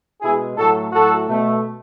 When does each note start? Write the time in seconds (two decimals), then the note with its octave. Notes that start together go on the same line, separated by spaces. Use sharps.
0.22 B2 G#3 E4 G#4
0.57 A2 F#3 A3 F#4 A4
0.92 A2 F#3 A3 F#4 A4
1.28 B2 A3